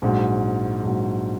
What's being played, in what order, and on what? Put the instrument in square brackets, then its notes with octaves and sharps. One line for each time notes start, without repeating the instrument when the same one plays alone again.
[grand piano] A#1 G#2 F#3
A#1 G#2 F#3